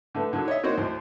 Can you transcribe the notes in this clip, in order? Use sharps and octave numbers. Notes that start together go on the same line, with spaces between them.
D3 A3 B3
A2 D3 D#3 F#3
C#5 D#5 E5
A#3 C4 D#4 F#4 C5 C#5
D2 A2 C5